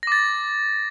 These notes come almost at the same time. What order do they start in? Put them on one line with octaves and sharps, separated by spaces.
A#6 D6 A6